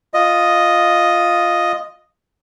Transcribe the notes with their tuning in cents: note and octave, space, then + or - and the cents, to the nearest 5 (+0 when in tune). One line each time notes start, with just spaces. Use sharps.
F4 +0 D#5 +0